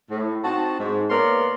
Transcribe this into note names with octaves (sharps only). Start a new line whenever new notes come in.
A2
C4 D#4 F#4 A5
G#2
A#3 B3 A#4 C#5 D5 C6